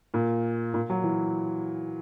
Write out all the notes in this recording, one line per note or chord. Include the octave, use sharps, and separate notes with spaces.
A#2
A#2
F#3
E3